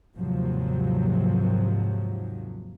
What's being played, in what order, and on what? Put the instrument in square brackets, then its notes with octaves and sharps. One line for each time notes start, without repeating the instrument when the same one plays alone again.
[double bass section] D#2 G#2 C3 F3 F#3